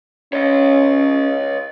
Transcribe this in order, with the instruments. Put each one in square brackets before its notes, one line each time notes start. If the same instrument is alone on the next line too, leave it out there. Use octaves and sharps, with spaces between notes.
[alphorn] C#4 [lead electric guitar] C#5 D#5